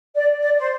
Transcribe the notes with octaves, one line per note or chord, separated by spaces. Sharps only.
D5
D5
C5